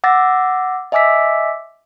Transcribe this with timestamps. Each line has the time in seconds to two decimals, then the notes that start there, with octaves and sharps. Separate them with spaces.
0.04 F#5 D6 E6 A6 A#6
0.92 D#5 E5 G#5 D6 E6 B6